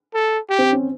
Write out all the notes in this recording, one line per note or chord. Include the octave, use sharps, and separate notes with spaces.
A4
G4
C4
C#4